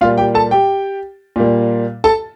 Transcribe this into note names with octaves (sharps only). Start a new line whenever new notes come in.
A#2 G3 A#3 F4 F5
G4 G5
A4 A5
G4 G5
A#2 G3 A#3
A4 A5